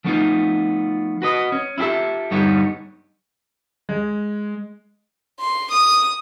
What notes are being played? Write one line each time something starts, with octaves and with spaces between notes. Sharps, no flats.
F3 A3 B3 C4 D#4 F4
F#4 B4 D#5
C#4
E4 F4 G4 A4 E5
G2 D3 G3 B3 D#4 C#5
G#3
C6
D#6